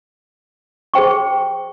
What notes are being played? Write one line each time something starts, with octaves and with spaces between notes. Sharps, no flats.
G#4 C5 G5 C#6